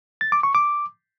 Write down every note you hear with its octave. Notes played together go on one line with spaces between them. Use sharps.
A6
D6
C#6
D6